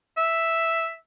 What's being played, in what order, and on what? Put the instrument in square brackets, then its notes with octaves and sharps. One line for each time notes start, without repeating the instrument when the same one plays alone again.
[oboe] E5